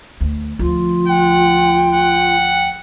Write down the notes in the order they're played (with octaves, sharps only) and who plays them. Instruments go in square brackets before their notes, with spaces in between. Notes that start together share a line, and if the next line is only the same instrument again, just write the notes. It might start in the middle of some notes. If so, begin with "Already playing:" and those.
[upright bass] D2
[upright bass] D2 F3 [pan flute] F4
[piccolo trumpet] F#5 [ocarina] G5
[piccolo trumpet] F#5